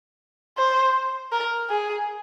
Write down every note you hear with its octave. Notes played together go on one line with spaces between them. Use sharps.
C5
A#4
G#4